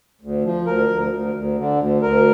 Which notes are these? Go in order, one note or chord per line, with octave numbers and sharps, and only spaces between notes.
D2
F3
D2 A#4
D2
D2
D2
D3
D2
D2 A#4